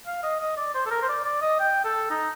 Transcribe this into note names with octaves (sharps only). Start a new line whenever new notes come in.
F5
D#5
D#5
D5
C5
A4
A#4
C5
D5
D5
D#5
G5
A4
D#4